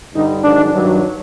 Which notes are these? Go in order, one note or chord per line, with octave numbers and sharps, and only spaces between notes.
G2 D3 G3 D#4
G#2 D#3 F#3 D4
G2 D#3 F#3